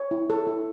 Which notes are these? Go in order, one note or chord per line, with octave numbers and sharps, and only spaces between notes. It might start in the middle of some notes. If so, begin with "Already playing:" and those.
Already playing: C#5
E4
A4
E4